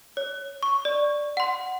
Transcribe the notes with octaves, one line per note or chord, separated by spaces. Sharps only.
C#5
C#6
D5
F#5 C6